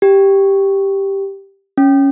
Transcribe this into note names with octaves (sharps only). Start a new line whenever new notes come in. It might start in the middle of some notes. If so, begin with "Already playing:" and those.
G4
C#4